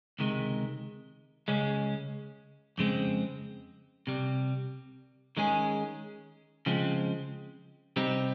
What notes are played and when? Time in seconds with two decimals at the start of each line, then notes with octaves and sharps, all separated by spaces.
0.19 C#2 C3 D#3 G#3
1.48 C#2 C#3 G#3 C#4
2.78 F2 C#3 G#3 C4
4.07 C2 C3 G3
5.37 D#3 G#3 C#4 G#4
6.66 C#3 F3 G#3 C4
7.96 C3 G3 C4 D#4